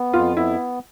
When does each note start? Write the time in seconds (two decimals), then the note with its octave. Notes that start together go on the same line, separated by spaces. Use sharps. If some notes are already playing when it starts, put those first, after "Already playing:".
Already playing: B3
0.13 F2 F4
0.37 B3 E4